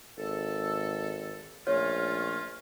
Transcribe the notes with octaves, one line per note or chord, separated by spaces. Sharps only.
G#1 A4
A#1 A3 C#4 F4 C#5